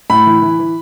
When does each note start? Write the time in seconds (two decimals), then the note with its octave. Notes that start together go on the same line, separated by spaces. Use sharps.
0.10 A2 B5
0.26 E3
0.42 E3
0.59 E3